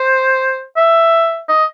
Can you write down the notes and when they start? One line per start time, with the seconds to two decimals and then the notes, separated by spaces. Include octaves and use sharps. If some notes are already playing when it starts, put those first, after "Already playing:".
Already playing: C5
0.76 E5
1.49 D#5